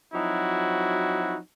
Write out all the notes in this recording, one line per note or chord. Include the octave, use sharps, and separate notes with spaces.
F3 F#3 C4 D#4 E4 F#4